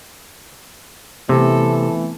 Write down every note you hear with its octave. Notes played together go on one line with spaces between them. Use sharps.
C3 E3 A3 B3 C4 A4